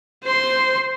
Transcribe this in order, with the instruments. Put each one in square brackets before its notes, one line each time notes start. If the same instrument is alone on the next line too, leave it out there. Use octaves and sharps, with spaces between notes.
[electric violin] C5 C6